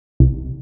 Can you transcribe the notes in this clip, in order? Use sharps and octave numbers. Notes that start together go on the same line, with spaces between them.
C2